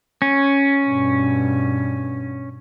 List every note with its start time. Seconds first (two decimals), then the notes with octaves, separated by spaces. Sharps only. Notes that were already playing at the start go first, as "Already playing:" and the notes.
0.22 C#4
0.86 G2 B2